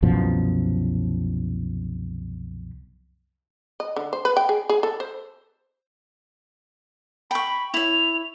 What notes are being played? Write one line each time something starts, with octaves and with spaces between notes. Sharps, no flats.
C2 F#2 B2 F3
D#5
D3
C5
B4
G5
G#4
G#4
A4
C5
G5 B5 C#6
E4 C#5 F7